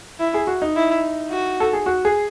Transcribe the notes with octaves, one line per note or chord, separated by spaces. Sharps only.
E4
G#4
F#4
D#4
E4
F#4
A4
G#4
F#4
G#4